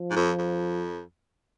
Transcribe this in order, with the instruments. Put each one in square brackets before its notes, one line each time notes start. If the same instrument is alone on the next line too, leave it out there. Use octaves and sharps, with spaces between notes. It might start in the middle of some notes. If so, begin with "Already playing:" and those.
Already playing: [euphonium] F3
[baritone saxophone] G#2
F2
F2